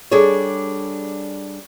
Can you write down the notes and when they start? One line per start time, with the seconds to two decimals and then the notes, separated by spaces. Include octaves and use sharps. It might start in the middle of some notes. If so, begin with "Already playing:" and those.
0.11 G3 D4 G#4 A4 C#5